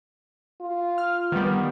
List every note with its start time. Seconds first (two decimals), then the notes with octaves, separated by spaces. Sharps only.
0.60 F4
0.98 F6
1.32 D#3 G3 B3